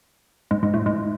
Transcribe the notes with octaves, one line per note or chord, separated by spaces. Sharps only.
G#2
G#2
A2
G#2